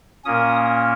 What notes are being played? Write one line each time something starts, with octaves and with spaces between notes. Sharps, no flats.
A#2 A#3 C#4 D#6